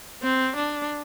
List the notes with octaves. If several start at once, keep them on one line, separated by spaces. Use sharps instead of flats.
C4
D4